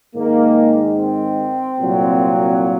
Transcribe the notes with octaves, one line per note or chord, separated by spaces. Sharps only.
G#2 D#3 G#3 A#3
C4
C2 A#2 F#3